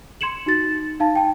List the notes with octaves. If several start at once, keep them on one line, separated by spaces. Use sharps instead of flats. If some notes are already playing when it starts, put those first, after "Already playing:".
C6 G#6 C#7 E7 F#7
D#4 F#4 A6
D#4 F5 A5
G5 A5